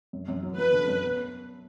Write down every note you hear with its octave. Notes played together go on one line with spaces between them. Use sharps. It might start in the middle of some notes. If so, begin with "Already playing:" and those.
F#2
F#2
F#3
F#3 B4
D3
F#2
B3